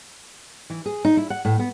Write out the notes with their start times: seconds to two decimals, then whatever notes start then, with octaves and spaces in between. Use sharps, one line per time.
0.70 E3
0.86 G#4
1.05 D#4
1.17 E4
1.30 F#5
1.45 A2
1.59 B3